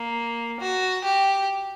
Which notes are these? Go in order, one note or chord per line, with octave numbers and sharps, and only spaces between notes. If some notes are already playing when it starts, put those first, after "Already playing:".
Already playing: A#3
F#4
G4